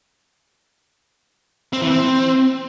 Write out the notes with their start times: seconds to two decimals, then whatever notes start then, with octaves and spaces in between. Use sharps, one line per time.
1.73 C4
1.81 E3
1.90 C4